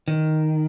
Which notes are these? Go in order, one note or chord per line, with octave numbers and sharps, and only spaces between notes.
D#3